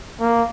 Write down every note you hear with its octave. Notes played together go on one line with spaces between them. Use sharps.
A#3